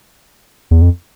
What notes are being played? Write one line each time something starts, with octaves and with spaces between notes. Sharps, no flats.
E2
F2